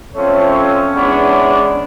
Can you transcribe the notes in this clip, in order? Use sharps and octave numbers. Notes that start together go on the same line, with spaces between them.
F3 A3 C4 C#4 C#5
E3 G#3 B3 D4